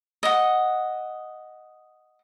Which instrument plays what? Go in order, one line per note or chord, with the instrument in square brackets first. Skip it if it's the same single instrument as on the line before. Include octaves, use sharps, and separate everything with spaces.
[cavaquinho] D#5 F#5